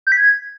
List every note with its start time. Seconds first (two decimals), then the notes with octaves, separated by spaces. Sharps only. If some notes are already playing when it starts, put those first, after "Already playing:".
0.07 G6
0.12 B6
0.17 G#6